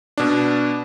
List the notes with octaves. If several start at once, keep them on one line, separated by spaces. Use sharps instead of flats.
B2 D4